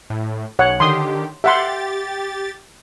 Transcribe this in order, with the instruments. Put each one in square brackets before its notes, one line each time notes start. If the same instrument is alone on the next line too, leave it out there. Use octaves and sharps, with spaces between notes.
[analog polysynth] A2
[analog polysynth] B1 [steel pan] C#5 F#5
[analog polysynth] D3 D#3 G4 [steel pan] C6 D#6
[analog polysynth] G4 A6 [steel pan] E5 F#5 C6